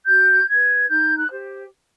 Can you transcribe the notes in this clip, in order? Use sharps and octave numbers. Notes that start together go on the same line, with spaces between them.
F#4 G6
B4 G#6
D#4 G6
F#6
G4 C5